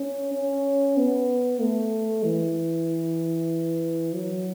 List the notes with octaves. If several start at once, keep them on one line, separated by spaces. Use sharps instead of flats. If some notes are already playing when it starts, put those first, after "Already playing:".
Already playing: C#4
C#4
B3
A3
E3
F#3